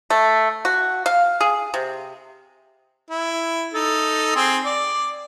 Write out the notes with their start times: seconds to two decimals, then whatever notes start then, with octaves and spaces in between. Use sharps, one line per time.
0.10 A3
0.65 F#4
1.06 F5
1.41 G#4
1.74 C3
3.10 E4
3.74 D#4 A4
4.36 C4 G#4 C5
4.64 D5